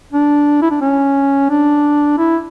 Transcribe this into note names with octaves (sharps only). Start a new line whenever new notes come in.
D4
E4
D4
C#4
D4
E4